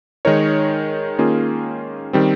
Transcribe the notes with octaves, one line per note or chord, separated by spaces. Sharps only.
D#3 G#3 D#4 A#4 C#5
D#3 A#3 C#4 F4 G#4
D#3 G3 C4